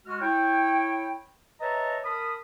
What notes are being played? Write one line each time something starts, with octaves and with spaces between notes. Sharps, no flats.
G#3 F#4 F6
E4 C#5 G5
B4 C#5 D#5 E5 A5 A#5
A#4 A5 B5 D#6